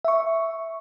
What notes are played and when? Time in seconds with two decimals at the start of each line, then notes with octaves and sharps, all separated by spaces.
0.05 E5 C#6